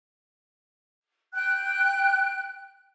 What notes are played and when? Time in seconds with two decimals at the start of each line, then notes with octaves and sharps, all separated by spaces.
1.34 G5 F#6